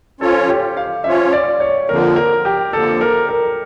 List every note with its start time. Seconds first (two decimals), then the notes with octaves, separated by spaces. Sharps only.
0.21 F3 C#4 F4 A4 C#5
0.49 G4
0.77 F5
1.04 F3 C#4 F4 C#5 E5
1.33 D5
1.60 C#5
1.89 F2 D3 F3 A#3 A#4
2.16 A#4
2.45 G4
2.73 F2 D3 F3 A#3 A4
3.01 A#4
3.29 A#4